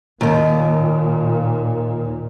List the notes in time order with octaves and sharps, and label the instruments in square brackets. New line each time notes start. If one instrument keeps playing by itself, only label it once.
[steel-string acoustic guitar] D#2 D#3 [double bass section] A#2